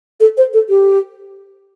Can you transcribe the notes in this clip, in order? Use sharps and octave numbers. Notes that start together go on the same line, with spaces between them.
A4
C5
A4
G4